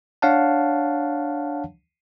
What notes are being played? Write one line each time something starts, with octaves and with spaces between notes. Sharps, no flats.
D4 C#5 F5 F#5 A5